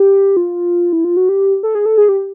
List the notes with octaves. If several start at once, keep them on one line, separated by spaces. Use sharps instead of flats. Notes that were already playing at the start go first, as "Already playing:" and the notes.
Already playing: G4
F4
E4
F4
F#4
G4
A4
G#4
A4
G#4
G4